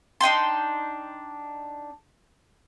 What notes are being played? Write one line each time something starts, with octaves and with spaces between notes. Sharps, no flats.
D4 D#4 G5 C6